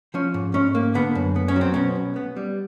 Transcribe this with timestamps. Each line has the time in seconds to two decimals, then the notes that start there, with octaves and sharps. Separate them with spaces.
0.14 F3 C#4
0.34 G#2
0.54 G#2 C#4
0.75 A#3
0.95 D3 B3
1.15 F#2
1.36 B3
1.48 C#4
1.56 F#3
1.61 C4
1.74 B2 C#4
1.96 B1
2.16 B3
2.36 G3